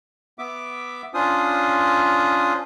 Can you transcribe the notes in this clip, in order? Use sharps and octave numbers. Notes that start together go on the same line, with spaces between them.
B3 E5 D6
C#4 D4 F4 C5 D#6